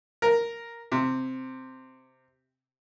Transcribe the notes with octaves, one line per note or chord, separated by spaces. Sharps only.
A#4
C3